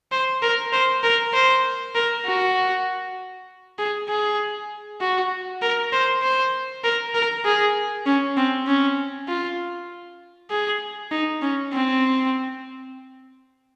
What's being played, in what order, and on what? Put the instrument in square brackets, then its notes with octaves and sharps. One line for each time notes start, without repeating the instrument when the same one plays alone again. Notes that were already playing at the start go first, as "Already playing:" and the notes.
[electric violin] C5
A#4
C5
A#4
C5
A#4
F#4
G#4
G#4
F#4
A#4
C5
C5
A#4
A#4
G#4
C#4
C4
C#4
F4
G#4
D#4
C#4
C4